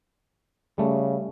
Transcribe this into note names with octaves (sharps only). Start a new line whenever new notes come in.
C#3 G3 A3